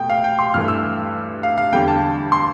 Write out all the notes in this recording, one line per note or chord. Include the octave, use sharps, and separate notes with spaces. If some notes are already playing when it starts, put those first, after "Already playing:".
Already playing: B2 A3 G5
F5
G5
C6
G2 E3 A3 F6
E6
F5
F5
E2 D3 G3 G5
A5
C6